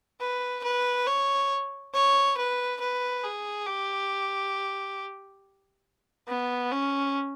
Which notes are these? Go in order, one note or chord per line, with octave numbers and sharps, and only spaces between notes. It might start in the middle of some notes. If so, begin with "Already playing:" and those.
B4
B4
C#5
C#5
B4
B4
G#4
G4
B3
C#4